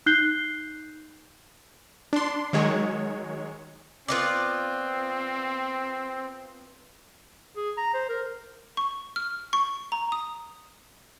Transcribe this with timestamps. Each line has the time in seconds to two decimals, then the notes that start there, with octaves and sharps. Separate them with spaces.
0.06 D#4 F#6 G6 C7 G7
2.13 D4 C6
2.53 D#3 F#3 G#3 C#5
4.08 B3 C4 F4 D5
7.56 G#4
7.77 A#5
7.94 C5
8.09 A#4
8.77 C#6
9.16 F6
9.53 C#6
9.92 A#5
10.12 D#6